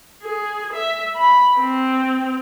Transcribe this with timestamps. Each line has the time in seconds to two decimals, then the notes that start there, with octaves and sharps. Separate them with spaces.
0.22 G#4
0.73 E5
1.16 B5
1.59 C4